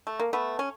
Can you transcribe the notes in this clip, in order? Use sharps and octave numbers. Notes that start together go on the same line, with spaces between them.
A3
A#3
A3 B3
C#4